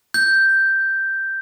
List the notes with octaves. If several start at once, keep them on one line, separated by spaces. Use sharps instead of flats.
G6